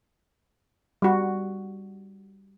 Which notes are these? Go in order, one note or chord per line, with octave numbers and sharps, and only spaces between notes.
G3 F#4